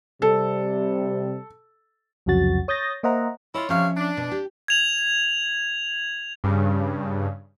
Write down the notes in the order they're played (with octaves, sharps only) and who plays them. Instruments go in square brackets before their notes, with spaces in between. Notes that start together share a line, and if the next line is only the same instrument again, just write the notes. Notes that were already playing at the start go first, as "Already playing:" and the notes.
[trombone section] C3 G3 [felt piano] A4
[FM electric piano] C2 F2 C#3 F#3 F#4 A6
C#5 D#6 G6 A6 A#6
A#3 C5 D#5 E5 F#5 A#5
[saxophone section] E4 F4 C#5 [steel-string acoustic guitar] D#5
[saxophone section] C3 C#5 F5 [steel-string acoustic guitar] F3 C#4 E5
[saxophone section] D4
[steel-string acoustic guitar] B2
G4
[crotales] G#6 F7 F#7
[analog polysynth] G2 C#3